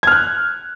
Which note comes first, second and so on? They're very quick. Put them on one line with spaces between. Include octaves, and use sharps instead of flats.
G#6 F6 F#6